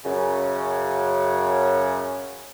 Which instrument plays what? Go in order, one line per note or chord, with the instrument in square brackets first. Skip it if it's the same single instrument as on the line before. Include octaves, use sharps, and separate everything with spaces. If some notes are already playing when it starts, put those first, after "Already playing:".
[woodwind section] F#2 C#3